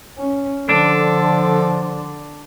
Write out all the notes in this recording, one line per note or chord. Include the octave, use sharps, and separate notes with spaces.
C#4
D3 F3 D4 A4